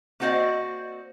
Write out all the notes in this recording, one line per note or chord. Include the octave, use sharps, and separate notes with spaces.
A#3 C4 F#4 C5 D5 D#5